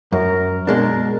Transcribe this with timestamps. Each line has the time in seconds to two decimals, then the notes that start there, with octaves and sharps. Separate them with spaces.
0.12 F#2 A#4
0.67 B2 G#3 D4 A#4